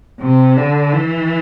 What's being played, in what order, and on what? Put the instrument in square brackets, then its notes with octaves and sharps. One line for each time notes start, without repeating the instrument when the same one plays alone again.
[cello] C3
D3
E3